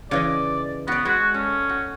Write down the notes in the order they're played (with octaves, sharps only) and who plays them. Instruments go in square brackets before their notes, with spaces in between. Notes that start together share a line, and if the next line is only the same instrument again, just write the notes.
[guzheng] C#3 E3 D#5 [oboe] D5
[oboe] B3 [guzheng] F#4 D5
[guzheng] G#3 G#4 B5 [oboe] F#4
[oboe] C#4 [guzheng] A4
[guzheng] F#4